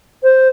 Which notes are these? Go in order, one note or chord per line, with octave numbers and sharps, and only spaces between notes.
C5